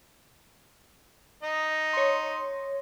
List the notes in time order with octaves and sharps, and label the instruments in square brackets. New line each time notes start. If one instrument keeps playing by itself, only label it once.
[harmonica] D#4 D#5
[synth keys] C#5 C6